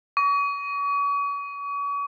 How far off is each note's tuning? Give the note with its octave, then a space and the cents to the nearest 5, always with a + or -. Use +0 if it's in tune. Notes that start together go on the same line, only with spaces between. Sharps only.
C#6 +40